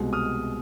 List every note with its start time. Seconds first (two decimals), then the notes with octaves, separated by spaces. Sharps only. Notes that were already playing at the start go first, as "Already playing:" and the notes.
Already playing: C2 B2 G#3
0.13 D#6 F6